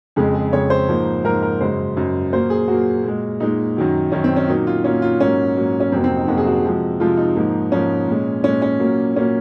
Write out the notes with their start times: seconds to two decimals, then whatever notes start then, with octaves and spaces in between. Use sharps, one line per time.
0.16 F2 C#3 G#3 G#4
0.34 G#4
0.52 F2 C#3 G#3 C#5
0.70 C5
0.89 G#2 F3 A#3
1.24 G#2 F3 A#3 A#4
1.43 A#4
1.61 F#2 C#3 G#3 C5
1.97 F#2 C#3 G#3
2.32 A#2 F#3 A#3 C5
2.50 G#4
2.68 A#2 F#3 A#3 F#4
3.04 A#2 G#3
3.40 A#2 G#3 D#4
3.77 F#2 D#3 F#3
4.12 F#2 D#3 F#3 C#4
4.24 C4
4.36 C#4
4.48 A#2 F#3 A#3 D#4
4.67 F4
4.84 A#2 F#3 A#3 C#4
5.02 F4
5.20 G#2 F#3 A#3 C#4
5.57 G#2 F#3 A#3
5.80 C#4
5.92 F2 C3 F#3 A#3 C4
6.04 C4
6.16 D#4
6.28 F2 C3 F#3 A#3 F#4
6.37 G#4
6.47 F#4
6.65 C3 F3 G#3
7.00 C3 F3 G#3 F4
7.17 D#4
7.36 G#2 F3 A#3
7.72 G#2 F3 A#3 C#4
8.08 A#2 G#3
8.44 A#2 G#3 C#4
8.62 C#4
8.80 A#2 F#3 A#3
9.16 A#2 F#3 A#3 C#4